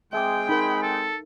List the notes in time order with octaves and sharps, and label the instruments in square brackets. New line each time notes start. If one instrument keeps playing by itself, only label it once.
[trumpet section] G#3 C4 G#4 [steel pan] E5 D6 [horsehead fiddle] G5
[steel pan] D#4 A#4 [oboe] B5
[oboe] A4